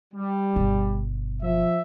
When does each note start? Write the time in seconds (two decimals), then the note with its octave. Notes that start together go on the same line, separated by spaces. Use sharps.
0.14 G3
0.56 G1 B2
1.42 F3 E5